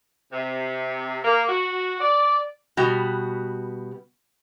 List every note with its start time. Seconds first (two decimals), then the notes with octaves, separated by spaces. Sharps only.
0.33 C3
1.24 A#3
1.49 F#4
2.01 D5
2.77 B2 G3 B3 F#4